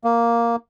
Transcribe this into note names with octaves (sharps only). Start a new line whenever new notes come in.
A#3